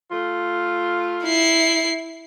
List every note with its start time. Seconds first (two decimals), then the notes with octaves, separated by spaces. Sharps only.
0.10 A3 F4
1.24 E4 C7